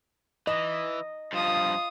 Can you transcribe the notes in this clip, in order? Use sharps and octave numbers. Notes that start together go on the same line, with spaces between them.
E3 D#5
G2 F3 F4 D#6